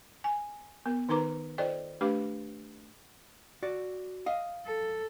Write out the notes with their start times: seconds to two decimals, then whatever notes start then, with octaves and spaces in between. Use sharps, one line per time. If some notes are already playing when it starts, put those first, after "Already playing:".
0.24 G#5
0.86 B3 A#4
1.09 D#3 D#4 A#4 B4 A#5 D6
1.58 F4 A4 C5 D5 D#5 G5
2.01 A3 D4 G4 B4 F5 D6
3.63 F#4 D5
4.26 D#5 F5
4.66 A4